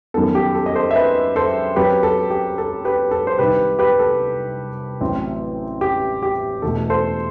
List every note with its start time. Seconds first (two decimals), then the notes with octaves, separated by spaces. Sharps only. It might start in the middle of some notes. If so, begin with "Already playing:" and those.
0.14 F#2 D#3 G3 B3 A4
0.35 G4
0.55 A4
0.66 D#5
0.75 A4 C5
0.91 E5
0.96 B4 D#5
1.36 A4 C5
1.76 F#2 F#3 C4 G4 B4
2.03 A4
2.30 G4
2.58 A4
2.85 G4 B4
3.11 A4
3.27 C5
3.39 C2 C3 D#3 G4 B4
3.79 G4 B4
3.99 A4
5.01 A1 A2 F#3 C4
5.81 G4
6.22 G4
6.62 E2 B2 A3 A4
6.90 A4 C5